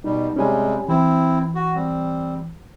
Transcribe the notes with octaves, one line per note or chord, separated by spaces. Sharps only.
B2 G3 D#4
C3 G3 G#3 C#4 G4 G#5
E3 C4 E4
F#4
G3 C4